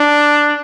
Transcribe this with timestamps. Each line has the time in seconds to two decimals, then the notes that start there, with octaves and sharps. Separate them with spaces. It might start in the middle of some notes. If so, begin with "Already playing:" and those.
Already playing: D4